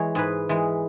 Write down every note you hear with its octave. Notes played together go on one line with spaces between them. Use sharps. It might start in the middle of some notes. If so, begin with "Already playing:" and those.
Already playing: E3 G#3 C#5
G#2 G#4 B4
E3 G#3